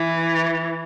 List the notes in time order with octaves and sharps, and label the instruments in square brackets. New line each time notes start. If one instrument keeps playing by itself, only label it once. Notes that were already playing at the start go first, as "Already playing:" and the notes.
Already playing: [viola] E3